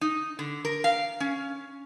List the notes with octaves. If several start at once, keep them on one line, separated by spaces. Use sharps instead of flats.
D#4
D3
A#4
F5
C#4